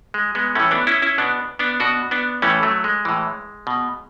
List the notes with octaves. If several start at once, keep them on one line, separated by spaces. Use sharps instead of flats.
G#3
G#3 B3
A2 E3 A3 C#4
B3 D4
C#4 E4
C#4 E4
B2 B3 D4
B3 D4
B2 D4 F#4
B3 D4
A2 E3 A3 C#4
F#3 A3
G#3
A2 E3
B2